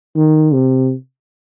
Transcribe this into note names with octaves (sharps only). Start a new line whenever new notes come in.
D#3
C3